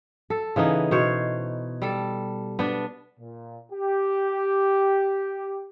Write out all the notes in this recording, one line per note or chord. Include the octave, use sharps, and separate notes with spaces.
A4
C#3 E3 B3 D#4
B2 C5 C#5
G3 A4
B3 D4
A#2
G4